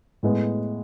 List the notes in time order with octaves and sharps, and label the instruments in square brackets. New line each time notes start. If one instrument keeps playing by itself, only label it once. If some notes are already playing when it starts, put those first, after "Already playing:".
[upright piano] A2 G#3 B3